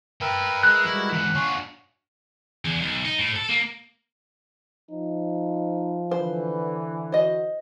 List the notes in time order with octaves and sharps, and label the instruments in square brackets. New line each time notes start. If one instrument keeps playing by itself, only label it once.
[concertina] A#4 B4 E5 [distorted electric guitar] G5 A5
[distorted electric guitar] G#3 [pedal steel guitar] F#6
[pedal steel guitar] G3 G#3 F#4 [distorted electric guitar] E4
[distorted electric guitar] G#2 E3 [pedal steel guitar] F#5
[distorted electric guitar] D4 F4 [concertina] C#5 G#5
[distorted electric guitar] E2
B1
D#4
A2
A4
A#3
[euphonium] F3 [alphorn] D#4
[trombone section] D3 E3 [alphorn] B4 [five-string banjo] C5
[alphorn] F#4 [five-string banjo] C5 D#5